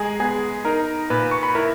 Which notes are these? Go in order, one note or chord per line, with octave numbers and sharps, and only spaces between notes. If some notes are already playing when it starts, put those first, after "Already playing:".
Already playing: G#3 G#4 G#5 A#5
B3 G#4 G#5
D#4 A#4 A#5
A#2 B4 B5
C#6
B5
E4 A#4 A#5